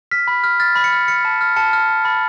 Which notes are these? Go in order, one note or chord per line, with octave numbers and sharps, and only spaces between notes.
F6 B6
B5
F6
F6 A6
B5
C#7
F6
F6 C#7
A5
F6
A5 C#7
F6
F6
B5 A6